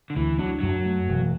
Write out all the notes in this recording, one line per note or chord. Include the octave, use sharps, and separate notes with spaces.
D3
D2 E3
F#3 D4
F#2 F#3
A3
E1